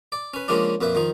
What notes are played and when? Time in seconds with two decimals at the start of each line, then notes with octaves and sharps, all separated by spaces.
0.12 D5
0.34 C#4 B4
0.48 C#3 F3 G#3 A#3 C#4 D4
0.81 F2 A#2 B4 E5
0.95 D#3 F3 D#4